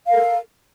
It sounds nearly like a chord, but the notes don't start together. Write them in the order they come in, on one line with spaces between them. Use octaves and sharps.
F5 A#4 A4